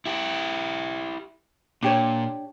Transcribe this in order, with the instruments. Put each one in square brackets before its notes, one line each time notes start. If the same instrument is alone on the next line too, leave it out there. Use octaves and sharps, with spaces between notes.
[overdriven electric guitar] E4 G4
[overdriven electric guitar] A#2 [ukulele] D4 G4 C#5